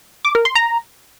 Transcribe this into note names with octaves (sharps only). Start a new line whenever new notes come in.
D6
A#4
C6
A#5